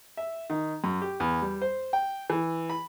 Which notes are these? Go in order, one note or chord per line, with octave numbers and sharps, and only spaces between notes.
E5
D#3
F#2
G4
E2
G3
C5
G5
E3
B5